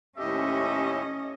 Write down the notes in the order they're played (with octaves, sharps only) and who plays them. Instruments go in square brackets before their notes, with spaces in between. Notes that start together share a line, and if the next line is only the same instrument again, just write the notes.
[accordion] D#2 A2 G4 [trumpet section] C4 A4 E5 [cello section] C#4 [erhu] D#5